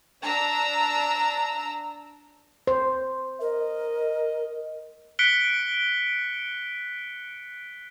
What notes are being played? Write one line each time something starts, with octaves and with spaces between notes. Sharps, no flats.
D4 A5 A#5 E6
C5
A#4 D#5
F#6 B6 C#7 D7 G7